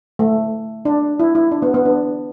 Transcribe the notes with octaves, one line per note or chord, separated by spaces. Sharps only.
A3
D4
E4
E4
D4
B3
B3
D4